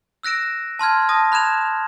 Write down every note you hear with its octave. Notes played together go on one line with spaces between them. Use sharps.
E6 F#6 A#6 D7 E7
A5 C6 F6 G#6
A5 D#6 A#6
B5 F#6 G#6 E7 F7